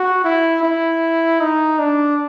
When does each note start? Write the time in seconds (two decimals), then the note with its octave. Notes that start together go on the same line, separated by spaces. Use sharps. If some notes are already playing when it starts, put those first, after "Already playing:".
Already playing: F#4
0.24 E4
0.63 E4
1.41 D#4
1.79 D4